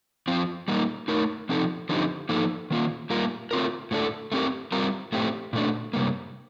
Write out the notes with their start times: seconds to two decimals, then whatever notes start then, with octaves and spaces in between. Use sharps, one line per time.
0.28 F3 C4 F4
0.68 G3 A#3 D#4
1.08 A3 D#4 A#4
1.49 F3 C4 D#4 A4
1.89 D3 F3 C4 D#4 G4
2.29 F3 A#3 D#4 A4
2.71 D#3 A#3 F4
3.10 G3 A#3 F4 A#4
3.51 A3 C4 F4 A#4
3.91 A2 A3 D4 A4
4.32 A3 C4 G4 A#4
4.72 G3 C4 F4 A#4
5.12 A2 A3 C4 G4
5.53 A#2 A3 D4
5.93 C3 G3 A#3